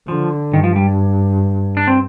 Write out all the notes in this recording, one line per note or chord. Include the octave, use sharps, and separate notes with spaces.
D3 F3
G2 D#3
F3
G3
D4
C4